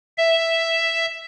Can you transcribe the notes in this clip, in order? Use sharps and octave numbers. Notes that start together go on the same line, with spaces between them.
E5